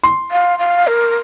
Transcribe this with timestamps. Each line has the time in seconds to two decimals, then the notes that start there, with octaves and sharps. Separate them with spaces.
0.04 C6
0.31 F5
0.59 F5
0.87 A#4